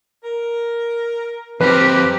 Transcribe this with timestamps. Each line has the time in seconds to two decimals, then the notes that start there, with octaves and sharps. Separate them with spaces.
0.24 A#4
1.61 F2 F3 C4 G4 A#4 B4